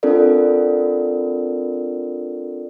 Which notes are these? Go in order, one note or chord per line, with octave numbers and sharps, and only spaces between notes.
C4 D4 F4 A4 A#4 D5